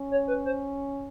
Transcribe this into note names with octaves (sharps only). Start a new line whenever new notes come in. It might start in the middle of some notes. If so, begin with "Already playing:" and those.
Already playing: C#4
C#5
B4
C5